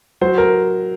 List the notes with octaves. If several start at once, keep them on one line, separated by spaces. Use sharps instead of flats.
F#3 C5
A#4